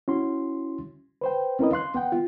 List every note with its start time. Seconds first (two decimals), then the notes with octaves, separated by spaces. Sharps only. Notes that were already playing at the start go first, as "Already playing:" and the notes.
0.08 C#4 E4 F#4 C6
1.21 B4 C5 G5
1.59 C4 C#4 E4 A#4 B4 D#5
1.72 F5 C6 F#6
1.94 B3 F#5 G5
2.12 F4